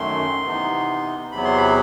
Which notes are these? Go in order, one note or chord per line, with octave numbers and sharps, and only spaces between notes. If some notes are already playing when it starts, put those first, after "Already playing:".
Already playing: F#2 D#3 A3 C6
C3 E3 B3 D#4
E2 C3 F#3 B3 B5
C6
B5